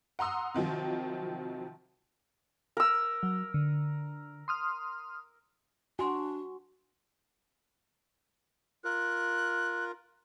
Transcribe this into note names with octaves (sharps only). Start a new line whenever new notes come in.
F#5 A#5 C6 D#6 E6
C3 D#3 F3 F#3
A#4 E6
F#3
D3
C6 D#6 F6
D4 F#4 G#5 C6
F4 A#4 F#6